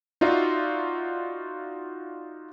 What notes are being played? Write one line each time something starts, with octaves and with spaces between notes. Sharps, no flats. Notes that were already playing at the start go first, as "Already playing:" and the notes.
D#4 F4 F#4 D5 E5